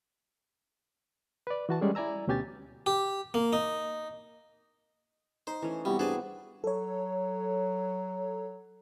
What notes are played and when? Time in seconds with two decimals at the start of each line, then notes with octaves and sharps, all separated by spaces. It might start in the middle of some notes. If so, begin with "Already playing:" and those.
1.47 B4 D5
1.69 E3 F#4 A5
1.81 G3 G#3 C#4 G#4 A4 D5
1.95 E4 D5 G#5 A#5 E6
2.27 D2 B2 C#4 G4 G#5 A6
2.86 G4
3.34 A#3
3.53 D#4
5.47 D#4 C5
5.62 E3 A3 C#4
5.85 C3 G3 B3 E4 F#4
5.99 G2 C4 G#4 B4 D5 A5
6.64 F#3 A4 C#5